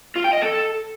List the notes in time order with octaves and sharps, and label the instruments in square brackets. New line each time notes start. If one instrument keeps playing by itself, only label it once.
[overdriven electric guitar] F4
G5
D#5
A4